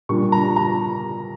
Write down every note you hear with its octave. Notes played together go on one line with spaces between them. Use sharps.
A#2 G3 D4 C#6
A#5
A#5